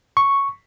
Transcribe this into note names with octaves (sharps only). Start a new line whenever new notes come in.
C#6